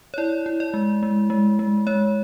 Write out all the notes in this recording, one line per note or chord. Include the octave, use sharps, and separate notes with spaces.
C#5
E4 D5
E4
D5
G#3
G#3
G#3
G#3
G#3 C#5